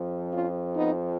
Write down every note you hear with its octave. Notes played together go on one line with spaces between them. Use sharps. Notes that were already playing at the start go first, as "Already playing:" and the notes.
Already playing: F2 F3
C#4 F4
B3 D#4